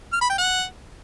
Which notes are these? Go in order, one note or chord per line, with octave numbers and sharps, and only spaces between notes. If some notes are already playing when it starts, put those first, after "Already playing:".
F6
B5
G5
F#5